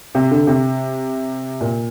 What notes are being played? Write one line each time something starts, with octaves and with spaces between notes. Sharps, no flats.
C3
D3
C3
A#2